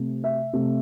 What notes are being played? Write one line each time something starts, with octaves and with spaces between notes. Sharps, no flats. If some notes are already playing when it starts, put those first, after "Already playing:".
Already playing: C3 A3
E5
C3 A3